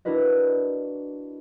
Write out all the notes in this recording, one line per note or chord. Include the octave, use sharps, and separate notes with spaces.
D4 E4 F#4 A#4 B4 D#5